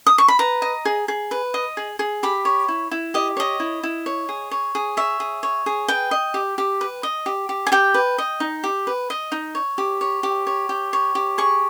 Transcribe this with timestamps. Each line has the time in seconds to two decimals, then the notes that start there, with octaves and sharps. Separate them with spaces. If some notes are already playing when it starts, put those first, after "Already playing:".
0.06 D#6
0.18 C#6
0.28 B5
0.39 B4 A#5
0.62 D#5
0.85 G#4
1.08 G#4
1.31 B4
1.54 D#5
1.77 G#4
1.99 G#4
2.23 G4 B5
2.45 C#5
2.68 E4
2.91 E4
3.14 G4 D#5
3.37 C#5 D#5
3.60 E4
3.83 E4
4.06 C#5
4.29 G#4
4.51 C#5
4.75 G#4
4.97 C#5 E5
5.20 G#4
5.43 C#5
5.66 G#4
5.88 B4 G5
6.11 D#5
6.34 G4
6.58 G4
6.81 B4
7.03 D#5
7.26 G4
7.49 G4
7.67 G#5
7.72 G4 G5
7.94 B4
8.18 D#5
8.40 D#4
8.64 G4
8.87 B4
9.10 D#5
9.32 D#4
9.55 C#5
9.78 G4
10.01 C#5
10.23 G4
10.47 C#5
10.69 G4
10.93 C#5
11.15 G4
11.38 G#4 C#6